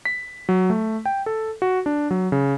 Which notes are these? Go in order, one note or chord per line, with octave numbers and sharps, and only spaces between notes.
B6
F#3
A3
G5
A4
F#4
D4
F#3
C#3